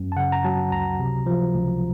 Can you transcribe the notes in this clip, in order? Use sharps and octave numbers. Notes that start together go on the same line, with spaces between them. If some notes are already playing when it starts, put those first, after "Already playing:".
Already playing: F#2
A5
C#3 F#5
A#5
F#3 A5
C#2 A#5
C3
F3
C#2